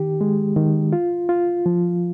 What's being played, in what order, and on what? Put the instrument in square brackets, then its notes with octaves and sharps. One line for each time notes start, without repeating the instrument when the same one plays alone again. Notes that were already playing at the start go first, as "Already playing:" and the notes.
Already playing: [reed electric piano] D#3 G4
G#3
D#3
F4
F4
F3